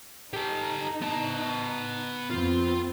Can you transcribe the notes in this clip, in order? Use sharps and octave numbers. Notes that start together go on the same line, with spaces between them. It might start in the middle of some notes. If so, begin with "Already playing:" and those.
D#4 G4 A4
B3 A5
F2 B3 C4 F4